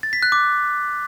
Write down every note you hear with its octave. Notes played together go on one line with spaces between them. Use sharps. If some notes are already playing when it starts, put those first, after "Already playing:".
A6
B6
F#6
D6